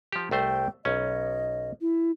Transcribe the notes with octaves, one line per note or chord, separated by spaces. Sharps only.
F3 G4
C2 A3 C5 G5
B1 C#4 D#5
E4